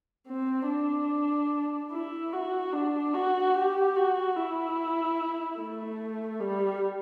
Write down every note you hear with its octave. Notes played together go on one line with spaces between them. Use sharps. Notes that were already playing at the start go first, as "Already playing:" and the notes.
C4
D4
E4
F#4
D4
F#4
G4
F#4
E4
A3
G3